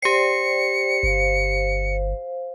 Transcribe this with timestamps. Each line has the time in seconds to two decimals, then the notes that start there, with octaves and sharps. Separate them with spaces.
0.02 G4 C5 D5 G5 C7 C#7
1.03 G1 C5 F5